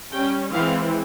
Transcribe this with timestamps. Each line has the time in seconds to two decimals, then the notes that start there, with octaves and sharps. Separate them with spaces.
0.13 G3 C#4 G5
0.52 E3 G#3 C4 F5